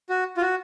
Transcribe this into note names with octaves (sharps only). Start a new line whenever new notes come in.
F#4
F4
F#4